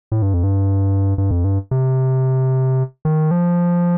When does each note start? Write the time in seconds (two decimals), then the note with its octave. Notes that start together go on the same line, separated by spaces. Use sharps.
0.12 A2
0.22 G2
0.34 F2
0.44 G2
1.18 G2
1.31 F2
1.44 G2
1.71 C3
3.05 D#3
3.31 F3